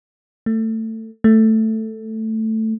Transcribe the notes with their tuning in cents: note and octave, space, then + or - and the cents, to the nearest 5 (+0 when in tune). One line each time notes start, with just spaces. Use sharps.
A3 +20
A3 +5